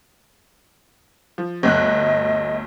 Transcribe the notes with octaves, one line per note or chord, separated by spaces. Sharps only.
F3
G1 D2 D#5 F#6